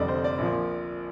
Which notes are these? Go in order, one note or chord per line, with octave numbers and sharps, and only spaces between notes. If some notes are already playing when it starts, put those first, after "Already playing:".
Already playing: F1 F2 D3 G3 D5 D#5
C5
D5
A#1 A#2 F3